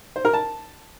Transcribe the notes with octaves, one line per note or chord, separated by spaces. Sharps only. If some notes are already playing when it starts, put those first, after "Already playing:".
C5
A#4
A5